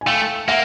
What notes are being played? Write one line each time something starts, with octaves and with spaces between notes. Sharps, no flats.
G#5
A3 F5 G5
A#3 E5 F#5